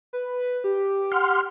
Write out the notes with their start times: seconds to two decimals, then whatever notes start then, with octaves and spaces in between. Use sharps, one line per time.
0.13 B4
0.64 G4
1.12 F#5 C6 F6